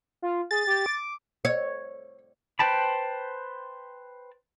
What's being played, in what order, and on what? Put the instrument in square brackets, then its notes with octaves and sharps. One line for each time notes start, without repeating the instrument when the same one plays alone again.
[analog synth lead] F4
[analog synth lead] G#4 [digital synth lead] A6
[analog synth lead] G4
D6
[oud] C#5
[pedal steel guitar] B4 C5 G5 A5 B5